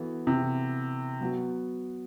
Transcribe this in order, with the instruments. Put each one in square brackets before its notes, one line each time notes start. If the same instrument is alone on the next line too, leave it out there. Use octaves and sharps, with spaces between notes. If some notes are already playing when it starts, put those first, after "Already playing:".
Already playing: [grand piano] E3 B3 F#4 A4
[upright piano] C3
[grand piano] F#3 B3 F#4